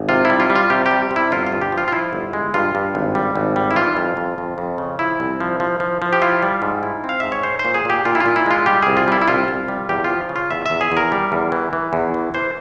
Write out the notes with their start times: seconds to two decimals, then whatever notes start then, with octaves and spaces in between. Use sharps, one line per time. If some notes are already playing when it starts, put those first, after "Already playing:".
Already playing: G#1
0.09 C3 F4
0.25 E4
0.30 G3
0.40 F4
0.50 G3
0.55 F4
0.70 C3 G4
0.86 G4
0.91 G3
1.11 C3
1.16 E4
1.31 G1 F4
1.47 F4
1.52 G2
1.62 G4
1.72 F3
1.78 F4
1.88 F4
1.92 F3 E4
2.13 G1
2.33 G#3
2.54 G2 F4
2.75 G2
2.95 G#1
3.15 G3
3.35 G#1
3.56 G3
3.71 E4
3.76 E3 F4
3.97 F2
4.17 F2
4.38 F2
4.58 F2
4.78 C#3
4.99 F3 E4
5.20 C2
5.40 F3
5.60 F3
5.80 F3
6.02 F3
6.13 G4
6.21 E4 F4
6.42 G3
6.62 G#2
6.83 E4
7.04 C4
7.09 F5
7.20 G#2 E5
7.32 C#5
7.43 C#4 C5
7.59 C5
7.65 A#2
7.74 G#4
7.85 A#2 G4
8.05 A#2 F4
8.15 E4
8.20 F4
8.26 A#2
8.36 E4
8.46 G#3 F4
8.66 G3 G4
8.82 C2 G#4
8.97 F4
9.08 G3 E4
9.21 E4
9.28 C2 F4
9.48 C2
9.68 G3
9.89 E2 G4
10.04 F4
10.10 F3
10.29 C#3
10.36 F4
10.51 E2 E5
10.66 E2 E5
10.81 G#4
10.92 E2 A#4
11.12 G3
11.32 E2
11.52 E3
11.73 E3
11.93 E2
12.14 E3
12.34 E3 C5